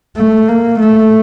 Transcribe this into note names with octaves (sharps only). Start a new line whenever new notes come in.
A3
A#3
A3